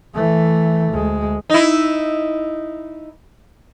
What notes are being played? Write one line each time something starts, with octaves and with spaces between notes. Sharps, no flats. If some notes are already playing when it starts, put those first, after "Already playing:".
E3 A3
D2 G#3
D#4 E4